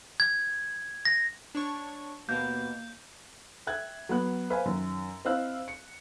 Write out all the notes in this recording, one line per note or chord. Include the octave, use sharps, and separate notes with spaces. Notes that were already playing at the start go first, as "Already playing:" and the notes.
G#6
A#6
D4 C#5 C#6
D#2 B2 A#3 G6
E5 G5 F#6 G#6
F#3 B3 F#6
B4 C5 F5 G#5
F#2 D#3
C4 E4 D#5 F5 E6 F#6
C#7